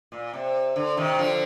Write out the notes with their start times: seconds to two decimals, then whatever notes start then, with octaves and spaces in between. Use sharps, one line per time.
0.12 A#2
0.33 C3
0.76 D3
0.97 C3 D#3
1.18 D3 F3